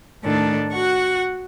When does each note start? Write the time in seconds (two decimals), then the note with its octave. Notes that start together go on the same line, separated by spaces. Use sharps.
0.24 A2 D#3 D4 A4
0.73 F#4 F#5 C#6